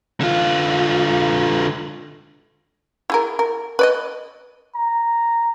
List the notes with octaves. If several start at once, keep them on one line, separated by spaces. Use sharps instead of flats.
D3 F4
E4 G#4 A#4
A#4
B4 D5 D#5
A#5